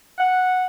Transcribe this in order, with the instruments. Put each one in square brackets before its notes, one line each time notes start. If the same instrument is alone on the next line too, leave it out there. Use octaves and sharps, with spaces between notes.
[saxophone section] F#5